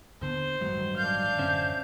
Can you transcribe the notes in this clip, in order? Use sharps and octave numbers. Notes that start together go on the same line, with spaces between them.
D#2 D3 B3 C5
A1 G2 D#3 F#3 G#3
D4 F5 G6
A1 F#2 D3 C#4 C5 E5